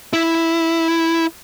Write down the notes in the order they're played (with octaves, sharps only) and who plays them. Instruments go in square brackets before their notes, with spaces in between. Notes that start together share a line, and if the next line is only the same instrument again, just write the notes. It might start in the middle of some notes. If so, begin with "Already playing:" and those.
[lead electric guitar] E4